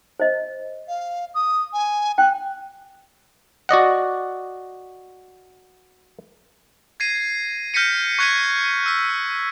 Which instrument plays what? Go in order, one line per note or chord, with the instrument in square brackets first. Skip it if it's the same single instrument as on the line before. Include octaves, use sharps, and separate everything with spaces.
[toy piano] C5 D#5
[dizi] F5
D#6
G#5
[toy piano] G5 [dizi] F#6
[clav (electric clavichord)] F#4 D5 D#5 F#5
[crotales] G#6 A#6 C7 D#7
F6 G6 A#6 B6 C#7 D#7
C#6 F#6 G#6 B6 C#7 D#7
E6 B6